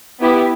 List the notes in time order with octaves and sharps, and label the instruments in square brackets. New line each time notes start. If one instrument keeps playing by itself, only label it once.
[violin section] B3 E4 G4